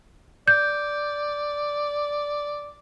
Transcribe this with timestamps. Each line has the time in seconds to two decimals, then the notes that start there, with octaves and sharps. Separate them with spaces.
0.48 D5 G6